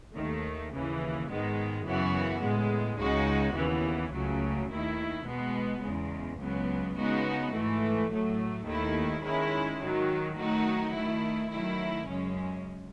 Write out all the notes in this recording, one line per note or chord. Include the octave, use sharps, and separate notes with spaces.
D#2 D#3 A3
D#2 C#3 E3
G#2 D#3 G#3 B3
F#2 C#3 E3 B3 F#4
A2 G#3 B3
C#2 C#3 G#3 D#4 F#4
D#2 C#3 E3 B3
C#2 C#3 F#3 A3
D#2 D#3 A3 E4
B2 G#3 B3
E2 C#3 G#3
C#2 C#3 F#3 B3
C#3 G#3 B3 D#4 F#4
G#2 E3 A3
A2 F#3 A3
D#2 D#3 A3 E4
D#3 G#3 C#4 E4
G#2 D#3 F#3
D#3 F#3 A3 D#4 F#4
D#3 A3 E4
D#3 F#3 A3 E4
F#2 C#3 G#3 C#4